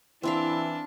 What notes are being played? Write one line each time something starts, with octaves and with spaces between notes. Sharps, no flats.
E3 C4 D4 E4 E5 F5